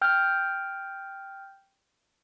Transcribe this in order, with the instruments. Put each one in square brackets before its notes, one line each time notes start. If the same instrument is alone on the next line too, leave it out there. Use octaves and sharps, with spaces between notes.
[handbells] G5 F6 G6